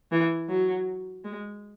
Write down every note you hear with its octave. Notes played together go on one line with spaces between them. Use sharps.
E3
F#3
G#3